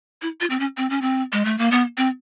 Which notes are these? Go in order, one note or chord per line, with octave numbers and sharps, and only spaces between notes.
E4
F4
C4
C#4
C4
C#4
C4
G#3
A3
A#3
B3
C4